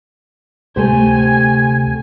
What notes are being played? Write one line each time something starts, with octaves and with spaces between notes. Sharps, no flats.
D2 C3 A3 G4 C5 G#5